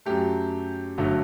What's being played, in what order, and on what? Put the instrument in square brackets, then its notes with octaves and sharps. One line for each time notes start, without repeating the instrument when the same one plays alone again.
[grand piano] F#2 F#3 A3 G4
G1 G2 F#3 A3